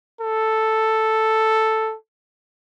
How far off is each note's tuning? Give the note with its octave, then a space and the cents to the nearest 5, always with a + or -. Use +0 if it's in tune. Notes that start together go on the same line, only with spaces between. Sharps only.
A4 +0